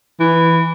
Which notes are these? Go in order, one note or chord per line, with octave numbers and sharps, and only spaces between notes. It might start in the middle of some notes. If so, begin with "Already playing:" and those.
E3